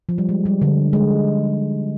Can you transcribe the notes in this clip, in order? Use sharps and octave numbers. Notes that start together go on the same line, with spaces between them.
F3
G3
G#3
G3
D3
G#3